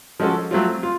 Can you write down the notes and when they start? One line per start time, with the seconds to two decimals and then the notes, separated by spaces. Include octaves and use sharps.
0.20 F3 G#3 C#4 F#4 A4
0.51 F#3 A3 C4 F4
0.83 F4